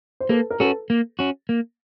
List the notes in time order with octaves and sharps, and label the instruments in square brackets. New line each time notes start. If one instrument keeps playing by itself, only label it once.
[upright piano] C5
[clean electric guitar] A#3 [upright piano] A4 B4
[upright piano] A#4
[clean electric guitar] C#4 F#4 [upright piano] A4 B4
[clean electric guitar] A#3
C#4 F#4
A#3